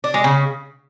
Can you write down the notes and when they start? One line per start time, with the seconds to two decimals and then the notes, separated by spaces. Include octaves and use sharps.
0.04 D4
0.14 G#3
0.24 C#3